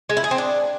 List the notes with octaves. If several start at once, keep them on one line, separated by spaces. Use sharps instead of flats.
G#3
E4
G#4
C4
D4